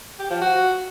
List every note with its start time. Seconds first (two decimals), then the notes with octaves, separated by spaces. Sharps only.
0.19 G4
0.30 F3
0.41 F#4